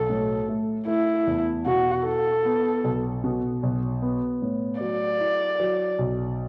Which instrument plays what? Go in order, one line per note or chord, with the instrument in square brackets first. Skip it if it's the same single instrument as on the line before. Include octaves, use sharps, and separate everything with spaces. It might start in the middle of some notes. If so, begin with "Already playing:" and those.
Already playing: [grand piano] B1 [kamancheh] A4
[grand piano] A2
A3
[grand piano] A3 [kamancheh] E4
[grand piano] E2
[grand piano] B2 [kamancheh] F#4
[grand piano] E4 [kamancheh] A4
[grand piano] B3
B1
B2
B1
B3
A2
[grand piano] F#3 [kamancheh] D5
[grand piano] E4
F#3
B1